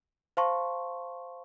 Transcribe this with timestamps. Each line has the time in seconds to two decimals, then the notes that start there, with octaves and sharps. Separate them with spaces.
0.37 C5 F5 A5 C6 C#6